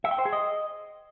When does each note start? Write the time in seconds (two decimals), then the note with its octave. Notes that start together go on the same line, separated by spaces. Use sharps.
0.04 E5
0.11 G5
0.18 C5
0.25 G#4
0.33 D#5